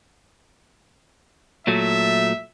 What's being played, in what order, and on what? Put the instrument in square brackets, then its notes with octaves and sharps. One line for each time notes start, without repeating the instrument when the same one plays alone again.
[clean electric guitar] A#2 F#3 A3 [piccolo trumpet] E5